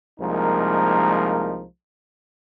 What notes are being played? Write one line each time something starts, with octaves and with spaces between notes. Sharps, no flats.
C2 F3 G#3 A#3 D#4 A#4